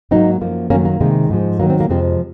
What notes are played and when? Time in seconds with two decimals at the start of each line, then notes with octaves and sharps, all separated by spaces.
0.11 G#2 F#3 A#3 C4 D#4
0.41 F#2 F3 A#3
0.70 F#2 D#3 F#3 A#3 C#4
0.85 A#3
1.01 C3 D#3 G#3
1.30 G#2 F3 G#3
1.60 G#2 D#3 F#3 A#3
1.70 C4
1.80 A#3
1.90 F2 C3 F3 G#3 C4